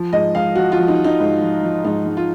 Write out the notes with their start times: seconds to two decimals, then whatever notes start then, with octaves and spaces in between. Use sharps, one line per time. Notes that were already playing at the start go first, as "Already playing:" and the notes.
Already playing: F3
0.13 G#2 D#5
0.35 G#2 F5
0.56 F3 F#4
0.72 F4
0.78 F3
0.88 D#4
0.99 F3
1.04 D#4
1.20 G#2
1.42 F3
1.63 F3
1.85 G#2 D#4
2.06 G#2
2.17 F4